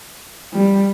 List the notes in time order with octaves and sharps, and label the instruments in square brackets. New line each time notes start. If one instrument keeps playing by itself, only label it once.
[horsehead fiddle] G3